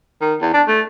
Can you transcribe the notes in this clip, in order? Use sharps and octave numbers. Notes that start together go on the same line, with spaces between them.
D#3
E2
D4
A3